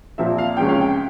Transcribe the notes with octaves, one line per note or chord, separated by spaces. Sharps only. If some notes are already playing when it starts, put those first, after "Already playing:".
A#2 F3 C4 E5
F5
C#2 C3 F3 G#3 C#4 G5
F5
G5